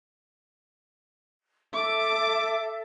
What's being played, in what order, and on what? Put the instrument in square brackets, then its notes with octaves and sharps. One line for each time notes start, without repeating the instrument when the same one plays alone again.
[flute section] A4 E5 [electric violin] D6